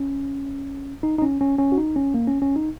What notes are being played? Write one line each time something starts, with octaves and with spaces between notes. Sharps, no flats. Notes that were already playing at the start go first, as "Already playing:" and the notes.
Already playing: C#4
D#4
D#4
C#4
C#4
C#4
F#4
D#4
C#4
A#3
C#4
C#4
D#4